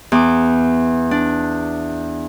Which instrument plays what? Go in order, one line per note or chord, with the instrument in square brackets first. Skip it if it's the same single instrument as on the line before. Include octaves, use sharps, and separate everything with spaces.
[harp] E2 D6
D4